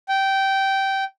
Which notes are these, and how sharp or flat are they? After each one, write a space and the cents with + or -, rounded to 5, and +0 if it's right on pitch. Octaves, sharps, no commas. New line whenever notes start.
G5 -15